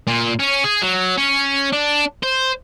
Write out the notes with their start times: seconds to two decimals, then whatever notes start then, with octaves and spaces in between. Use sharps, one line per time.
0.07 A#2
0.39 C#4
0.64 G#4
0.82 F#3
1.18 C#4
1.73 D4
2.23 C5